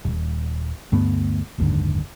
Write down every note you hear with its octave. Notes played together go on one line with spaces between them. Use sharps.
D#1
D2 G2 A3 B3
F#1 D#2 G#2 D3